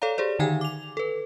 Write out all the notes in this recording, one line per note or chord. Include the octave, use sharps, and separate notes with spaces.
A4 C#5 D5 F5 A#5
G4 G#4 C5 D5
D3 D#3 D#4 G5 G#5 G#6
D6 F7
A4 B4